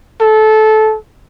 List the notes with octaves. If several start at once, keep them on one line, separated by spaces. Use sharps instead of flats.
A4